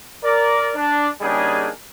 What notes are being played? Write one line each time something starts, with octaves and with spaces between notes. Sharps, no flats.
A#4 D5
D4
C#3 G3 A#3 D4 D#4 G#4